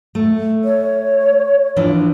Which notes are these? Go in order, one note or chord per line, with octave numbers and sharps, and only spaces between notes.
A3
C#5
E3 F3 D4